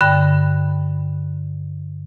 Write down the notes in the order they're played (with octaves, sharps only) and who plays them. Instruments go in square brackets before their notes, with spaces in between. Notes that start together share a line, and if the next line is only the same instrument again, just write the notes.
[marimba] G2 D3 G5 B5 F#6